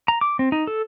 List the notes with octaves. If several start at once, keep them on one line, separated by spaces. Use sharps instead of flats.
A#5
D6
C4
D#4
A4